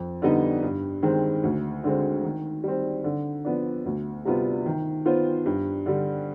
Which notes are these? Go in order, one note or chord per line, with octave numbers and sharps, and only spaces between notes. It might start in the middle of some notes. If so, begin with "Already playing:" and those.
Already playing: F2
D3 G3 B3 D#4
G2
D#3 G#3 C4
D2
D3 G#3 C4
D#3
G3 C4
D3
F3 B3 D4
D2
C3 G3 B3 F4
D#3
B3 F4 C5
G2
D3 G3